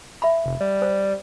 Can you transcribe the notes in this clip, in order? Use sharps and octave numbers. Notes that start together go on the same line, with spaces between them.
E5 B5
F1
G3
C5